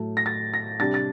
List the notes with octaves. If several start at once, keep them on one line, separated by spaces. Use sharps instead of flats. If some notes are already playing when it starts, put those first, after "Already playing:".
Already playing: A2 F#3 A3
A#6
A6
A#6
C3 G3 D4 A6
A6